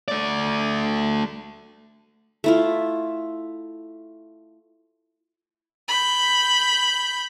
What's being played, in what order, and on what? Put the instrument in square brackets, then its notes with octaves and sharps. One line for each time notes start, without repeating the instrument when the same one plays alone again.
[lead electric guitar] A3 D5
[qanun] A3 E4 F4
[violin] B5 G6